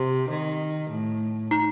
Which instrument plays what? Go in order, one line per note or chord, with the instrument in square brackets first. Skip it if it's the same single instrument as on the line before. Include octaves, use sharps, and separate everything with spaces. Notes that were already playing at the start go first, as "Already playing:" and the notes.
Already playing: [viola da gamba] C3
D#3
A2
[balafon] D#4